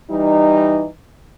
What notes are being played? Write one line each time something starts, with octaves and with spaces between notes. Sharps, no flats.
E3 G3 D#4